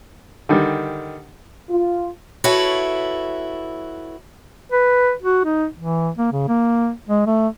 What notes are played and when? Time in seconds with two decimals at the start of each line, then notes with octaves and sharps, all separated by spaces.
0.49 D3 D#3 G3
1.70 F4
2.44 E4 F#4 A4 B4 C#5
4.72 B4
5.22 F#4
5.45 D#4
5.79 E3
6.18 A#3
6.32 C#3
6.48 A#3
7.09 G#3
7.27 A3